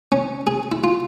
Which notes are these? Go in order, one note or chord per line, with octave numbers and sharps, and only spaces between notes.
C#4
G#4
E4
F4